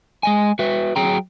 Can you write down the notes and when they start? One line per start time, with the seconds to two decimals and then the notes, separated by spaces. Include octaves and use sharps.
0.23 G#3 D#5 G#5
0.59 F#4 B4 E5
0.96 F#3 G#4 G5 A#5